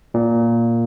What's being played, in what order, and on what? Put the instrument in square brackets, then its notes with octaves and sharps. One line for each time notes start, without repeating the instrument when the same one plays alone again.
[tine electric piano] A#2